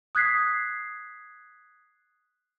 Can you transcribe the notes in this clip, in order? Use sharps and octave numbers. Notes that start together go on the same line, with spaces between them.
D#6 F#6 G#6 B6 C7